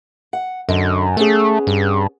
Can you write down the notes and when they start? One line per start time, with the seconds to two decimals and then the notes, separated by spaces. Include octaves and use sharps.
0.33 F#5
0.69 F#2 D3 D#5
1.17 A3 B3 C#4 G#4
1.67 G2